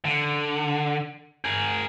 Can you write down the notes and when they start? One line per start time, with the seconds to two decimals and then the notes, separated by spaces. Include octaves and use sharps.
0.05 D3
1.44 G#4 A#4